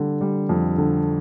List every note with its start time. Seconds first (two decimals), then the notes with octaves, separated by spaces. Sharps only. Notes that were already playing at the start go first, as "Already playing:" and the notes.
Already playing: D3 G3
0.21 G3
0.49 F2
0.78 D3